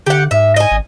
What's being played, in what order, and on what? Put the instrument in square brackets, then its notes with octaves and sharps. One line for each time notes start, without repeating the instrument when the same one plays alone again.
[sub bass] D3 [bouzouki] G4 F#5
[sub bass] G#2 [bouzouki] E5
[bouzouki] D#5 G#5
[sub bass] G#1